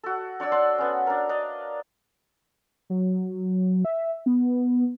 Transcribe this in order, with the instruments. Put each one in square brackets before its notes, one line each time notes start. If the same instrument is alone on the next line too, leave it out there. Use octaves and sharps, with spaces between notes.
[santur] F#4 A4
D4 C#5 D5 E6
D4 F#5 A5 C6
B3 C#4
D4 A#4
D4 D#5 F5
[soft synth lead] F#3
E5
B3